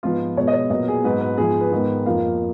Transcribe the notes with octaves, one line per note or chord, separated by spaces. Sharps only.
G#2 F3 B3 F4
B2 G#3 B3 C#5
D#5
C#5
A#2 F#3 B3 D#5
G#4
G#2 F#3 B3 B4
B4
G#2 F3 B3 G#4
B4
G#2 D#3 G#3 B3
F2 F3 A#3 F5